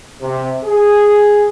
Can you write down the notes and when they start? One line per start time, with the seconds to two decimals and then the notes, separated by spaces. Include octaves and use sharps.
0.21 C3
0.65 G#4